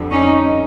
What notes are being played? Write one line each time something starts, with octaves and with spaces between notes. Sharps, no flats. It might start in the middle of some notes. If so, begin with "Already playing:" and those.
Already playing: F2 D3 G3
C#4 D#4